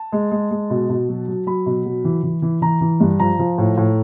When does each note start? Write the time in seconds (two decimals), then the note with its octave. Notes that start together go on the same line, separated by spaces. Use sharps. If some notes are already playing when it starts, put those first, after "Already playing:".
Already playing: A5
0.12 G#3
0.31 G#3
0.51 G#3
0.70 B2
0.89 B2
1.09 F#3
1.28 F#3
1.46 F#3 B5
1.66 B2
1.85 F#3
2.04 E3
2.23 E3
2.42 E3
2.62 E3 A#5
2.81 E3
3.00 G2
3.19 F3 A#5
3.39 F3
3.58 A2
3.77 A2